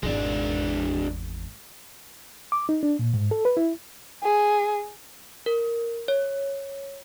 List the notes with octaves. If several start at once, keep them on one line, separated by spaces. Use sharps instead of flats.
G#1 E2 G#3 D4
D6
D#4
D4
A#2
G#2
A4
B4
E4
G#4
A#4
C#5